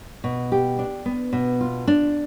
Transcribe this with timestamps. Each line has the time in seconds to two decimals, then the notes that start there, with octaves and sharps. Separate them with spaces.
0.24 B2
0.52 G4
0.79 D4
1.06 B3
1.33 B2
1.61 F4
1.87 D4